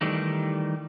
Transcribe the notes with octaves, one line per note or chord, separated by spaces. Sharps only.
D#3 E3 G3 A3 D#4